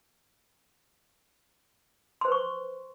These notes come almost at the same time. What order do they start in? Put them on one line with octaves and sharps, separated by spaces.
C6 C5 B4 C#6